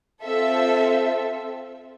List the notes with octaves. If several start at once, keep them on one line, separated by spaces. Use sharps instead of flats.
C4 F4 A4 E5